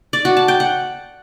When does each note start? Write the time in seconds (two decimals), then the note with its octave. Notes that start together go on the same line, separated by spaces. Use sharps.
0.13 D5
0.25 F#4
0.37 A5
0.48 G5
0.60 F#5